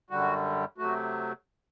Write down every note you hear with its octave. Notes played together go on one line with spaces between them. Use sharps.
F#2 D3 G3 F#4
C3 F#3 A3 F#4